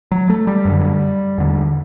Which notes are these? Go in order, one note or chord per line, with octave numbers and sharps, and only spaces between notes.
F#3
A3
G3
F#2
D3
E2 D3